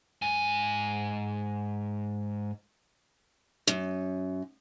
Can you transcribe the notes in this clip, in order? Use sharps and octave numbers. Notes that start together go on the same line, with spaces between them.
G#2 G#5
F#2